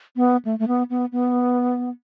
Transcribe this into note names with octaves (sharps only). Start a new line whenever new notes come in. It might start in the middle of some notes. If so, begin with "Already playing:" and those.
B3
A3
A3
B3
B3
B3